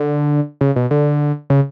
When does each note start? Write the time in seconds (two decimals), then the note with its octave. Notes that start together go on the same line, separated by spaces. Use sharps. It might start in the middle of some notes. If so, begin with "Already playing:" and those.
Already playing: D3
0.61 C#3
0.76 B2
0.91 D3
1.50 C#3